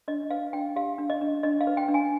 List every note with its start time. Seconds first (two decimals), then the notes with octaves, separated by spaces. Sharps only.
0.08 D4 D#5
0.31 B4 F5
0.53 D4 G5
0.76 G4 F5
0.98 D4
1.10 D#5
1.21 D4
1.43 D4 D#5
1.61 F5
1.67 B4
1.77 G5
1.88 D4
1.94 G#5